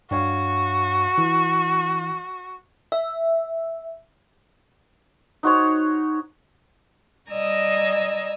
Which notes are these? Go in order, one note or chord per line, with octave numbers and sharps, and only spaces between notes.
G2 F#4 C#5 F5
E3
E5
D#4 F#4 C5 C#5
G3 D5 D#5 G#5 A#5 E6